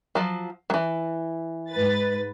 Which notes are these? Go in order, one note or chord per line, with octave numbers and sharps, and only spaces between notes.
F3 F#3
E3 F#3
G#2 B4 A6